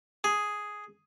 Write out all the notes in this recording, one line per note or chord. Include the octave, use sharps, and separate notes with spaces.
G#4